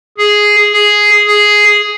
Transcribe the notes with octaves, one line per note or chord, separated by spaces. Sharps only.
G#4
G#4
G#4